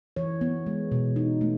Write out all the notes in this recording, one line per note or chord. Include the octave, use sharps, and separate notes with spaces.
E3 C#5
B3
G#3
B2
D#4
A3